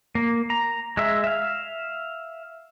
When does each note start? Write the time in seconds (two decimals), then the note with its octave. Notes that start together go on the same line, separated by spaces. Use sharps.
0.15 A#3
0.50 A#5
0.97 G#3 E5
1.24 E5 F5